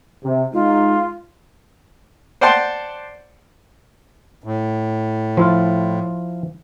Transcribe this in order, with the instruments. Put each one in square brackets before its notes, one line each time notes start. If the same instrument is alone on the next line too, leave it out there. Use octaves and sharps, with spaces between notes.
[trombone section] C3
[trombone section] G#3 D#4 [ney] F4
[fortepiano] C5 D5 F#5 G5 A5 C6
[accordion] A2
[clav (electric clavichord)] F3 E4 F4